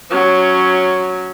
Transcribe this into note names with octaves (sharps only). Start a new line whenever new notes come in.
F#3 C#4